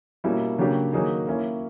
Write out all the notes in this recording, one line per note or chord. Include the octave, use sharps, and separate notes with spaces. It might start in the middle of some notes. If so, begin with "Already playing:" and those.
B2 G3 A#3 C#4 E4
C#3 F#3 A#3 D4 G4
D#3 F#3 A#3 D#4 G#4
F#3 A#3 C#4 E4